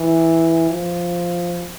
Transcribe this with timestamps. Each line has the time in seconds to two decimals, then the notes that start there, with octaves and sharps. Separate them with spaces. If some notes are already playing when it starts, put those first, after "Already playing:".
Already playing: E3
0.70 F3